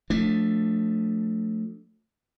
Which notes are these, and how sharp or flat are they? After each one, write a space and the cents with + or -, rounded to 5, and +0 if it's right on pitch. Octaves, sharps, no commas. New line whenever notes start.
F3 +25 A3 +5 D4 -5